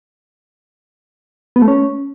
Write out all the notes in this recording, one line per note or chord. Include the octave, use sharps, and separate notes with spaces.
B3
A3
C#4